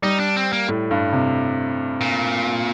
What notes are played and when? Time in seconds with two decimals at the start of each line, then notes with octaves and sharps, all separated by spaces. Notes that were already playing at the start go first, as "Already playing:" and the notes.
0.02 G3 D#4
0.20 D4
0.36 C4
0.53 A#3
0.68 A2
0.91 G2
1.13 C3
2.01 A#2